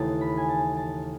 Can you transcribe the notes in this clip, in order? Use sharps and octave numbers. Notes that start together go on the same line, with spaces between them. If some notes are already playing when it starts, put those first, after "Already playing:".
Already playing: D#2 C#3 E3 A3 A5
B5
G#5
A5
A5